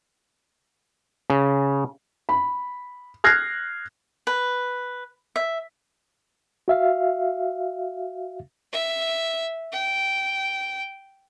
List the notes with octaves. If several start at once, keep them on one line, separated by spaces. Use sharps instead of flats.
C#3
B5
F6 F#6 G#6 A#6 C7
B4
E5
F#4 E5 F5
E5
G5